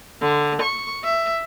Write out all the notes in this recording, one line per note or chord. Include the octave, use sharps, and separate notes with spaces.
D3
C#6
E5